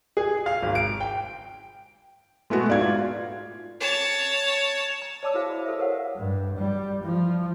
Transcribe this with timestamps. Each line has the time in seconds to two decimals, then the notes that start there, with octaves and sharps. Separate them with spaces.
0.17 G#4
0.46 F5
0.63 G#1
0.75 D7
1.00 G5
2.50 G#3 A3 B3 F#4
2.69 G#2 D5 F5 G#6
2.81 F4
3.80 C#5 A5
5.02 A#5
5.23 C#5 D5 A5 D6 E6
5.34 E4 F#4 G#4 C5 E5 F5
5.49 D5 B5
5.66 G4 A4 C5 E5
5.79 A#4 C5 C#5 F5 F#5
6.16 G2
6.57 G3
7.03 F3